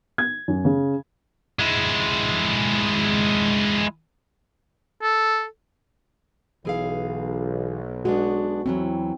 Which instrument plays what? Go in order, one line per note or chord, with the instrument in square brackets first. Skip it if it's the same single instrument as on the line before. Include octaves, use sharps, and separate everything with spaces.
[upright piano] G#6
F#2
C#3
[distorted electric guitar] G#3 E4
[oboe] A4
[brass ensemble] B1 [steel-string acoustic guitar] E3 G#4 F5
[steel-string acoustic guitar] G#3 B3 D4 [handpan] F#4
[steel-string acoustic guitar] E2 E3 F#3 [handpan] C4